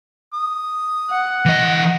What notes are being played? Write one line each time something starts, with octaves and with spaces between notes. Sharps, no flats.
D#6
F#5
E3 D#5